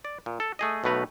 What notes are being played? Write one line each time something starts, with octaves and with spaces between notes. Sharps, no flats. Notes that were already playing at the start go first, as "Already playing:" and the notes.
D5
A#2
A4
A3 G#4 D#5
B1 B2 A3 B4 A#5